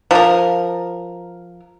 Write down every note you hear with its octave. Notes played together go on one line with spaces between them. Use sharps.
F3 A#4